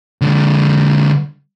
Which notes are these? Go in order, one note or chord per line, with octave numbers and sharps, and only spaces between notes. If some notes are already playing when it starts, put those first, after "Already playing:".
D3 G#3